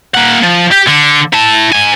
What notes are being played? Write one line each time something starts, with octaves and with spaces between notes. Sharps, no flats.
A#3 F#5
F3
G4
D3
E4 A5
G#2 G#5